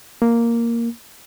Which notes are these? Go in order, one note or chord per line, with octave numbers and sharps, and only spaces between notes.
A#3